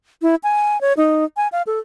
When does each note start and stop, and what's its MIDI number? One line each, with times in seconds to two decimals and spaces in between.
0.22 0.35 64
0.44 0.80 80
0.81 0.93 73
0.97 1.25 63
1.37 1.48 80
1.52 1.62 77
1.67 1.79 69